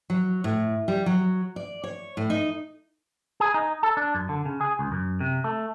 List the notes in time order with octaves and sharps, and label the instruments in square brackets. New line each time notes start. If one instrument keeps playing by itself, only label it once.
[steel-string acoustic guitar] F#3
A2
G3
F#3
D5
C#5
A2
D#4
[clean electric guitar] G#4
D#4
A4
D4
F#2
D3
C#3
G#4
C#2
F#2
C3
A3